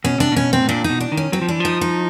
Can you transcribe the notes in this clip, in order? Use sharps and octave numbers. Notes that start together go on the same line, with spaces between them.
B2 C#4
C3 D4
B2 C#4
C4
A2
A#2 D4
D#4
B2
D4
D#3
C#4
F#3 C4
F3
E3 D4
F3 D#4
D#4